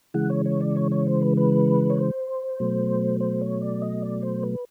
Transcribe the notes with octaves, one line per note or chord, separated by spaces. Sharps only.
C#3 E3 G#3 F#5
C#5
C#5
D5
C#5
C#5
C5
B4
B4
C#5
C5
B2 F#3 A3
C5
C#5
D5
D#5
D5
C5
B4